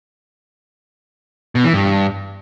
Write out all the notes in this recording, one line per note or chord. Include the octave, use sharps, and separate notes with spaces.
B2
E3
G2